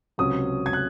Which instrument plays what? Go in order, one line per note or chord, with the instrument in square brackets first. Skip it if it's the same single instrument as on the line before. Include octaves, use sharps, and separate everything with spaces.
[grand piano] C#2 C3 F#3 C#4 D#6
G#6
F#6